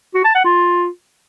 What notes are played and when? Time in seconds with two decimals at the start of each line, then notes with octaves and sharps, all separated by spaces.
0.15 F#4
0.25 A5
0.35 F#5
0.45 F4